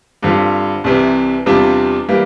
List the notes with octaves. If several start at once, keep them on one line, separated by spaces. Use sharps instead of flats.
G2 D3 G3 C4 F4
C2 C3 E3
E2 C3 G3 D4 F4
E3 G3 A#3